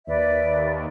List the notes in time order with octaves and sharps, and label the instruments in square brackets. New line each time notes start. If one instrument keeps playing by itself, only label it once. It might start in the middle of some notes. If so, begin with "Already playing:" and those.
[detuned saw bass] D#2 [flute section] B4 D5 E5